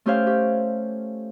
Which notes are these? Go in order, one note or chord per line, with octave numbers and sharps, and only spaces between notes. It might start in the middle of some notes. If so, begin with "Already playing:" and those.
A3 C#4 G4 C5 C#5 F5
G4